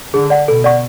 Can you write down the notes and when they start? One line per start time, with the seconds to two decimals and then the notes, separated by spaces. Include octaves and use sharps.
0.14 D3 G#4
0.30 D5 F#5
0.48 B2 A4
0.64 D5 F#5 C#6